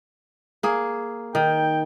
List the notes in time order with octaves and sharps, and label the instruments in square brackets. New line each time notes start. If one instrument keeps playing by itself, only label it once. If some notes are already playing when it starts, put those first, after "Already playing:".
[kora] A#3 G#4
[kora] D#3 [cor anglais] G5